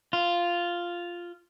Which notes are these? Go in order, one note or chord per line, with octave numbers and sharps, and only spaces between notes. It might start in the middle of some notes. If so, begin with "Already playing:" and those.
F4